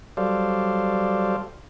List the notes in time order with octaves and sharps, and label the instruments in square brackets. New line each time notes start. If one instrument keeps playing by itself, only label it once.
[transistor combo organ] F#3 G3 A4 C5 D5 F5